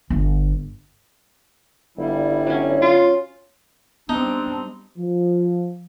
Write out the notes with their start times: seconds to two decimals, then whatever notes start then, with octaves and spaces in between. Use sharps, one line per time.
0.10 G1
1.98 G1 G3 E4
2.47 F#3 C#4
2.81 F4
4.09 G3 B3 C4 D4 D#4
4.98 F3